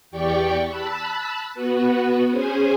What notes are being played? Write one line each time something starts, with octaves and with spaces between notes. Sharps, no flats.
E2 G4 D5 G5 C#6
A5 B5 E6 F#6
B3 F#4 B4
C#4 G#4 C5 G#5